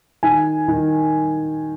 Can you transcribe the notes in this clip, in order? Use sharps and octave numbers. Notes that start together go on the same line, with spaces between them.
D#3 G#5
D#3